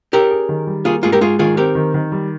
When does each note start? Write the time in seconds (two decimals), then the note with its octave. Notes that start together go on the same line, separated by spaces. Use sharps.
0.12 C#4 G4 A#4
0.31 G#4
0.49 D#3
0.67 G3
0.85 A#3 F4 G#4
1.03 G#2 F4 G#4
1.12 G4 A#4
1.21 G#2 F4 G#4
1.39 D#3 F4 G#4
1.57 C4 G4 A#4
1.75 D#3
1.94 D#3
2.12 G3